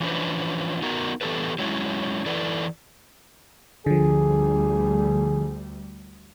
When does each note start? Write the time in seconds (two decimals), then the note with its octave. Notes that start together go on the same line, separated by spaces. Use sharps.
0.01 E3 F3 C#4 D4 B4 C5
0.82 B3 D#4 F#4 A#4 A#5
1.21 E3 B3 G4 A4 B4
1.59 F#3 G#3 C#4 E4
2.26 E3 E4 A4 B4 D5
3.86 D2 D3 F3 G3 G#4